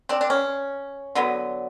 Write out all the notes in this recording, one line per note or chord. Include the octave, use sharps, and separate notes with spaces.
C4 D4
D4
C#4
D3 F#3 B3